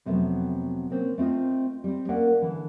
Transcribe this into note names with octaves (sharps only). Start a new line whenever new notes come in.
F2 C3 F#3 A3 B3
A#3 C4 C#4
A3 C4 F4 D#5
G3 C4
A#3 C#4 A#4 D5 F5 F#5
D3 E3